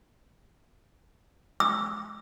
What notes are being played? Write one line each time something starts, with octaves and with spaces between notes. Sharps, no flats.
E6